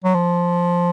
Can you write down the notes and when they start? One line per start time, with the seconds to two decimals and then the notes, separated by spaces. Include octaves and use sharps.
0.04 F#3
0.14 F3